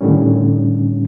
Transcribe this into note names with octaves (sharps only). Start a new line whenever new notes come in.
A2 D3 D#3 G3 C#4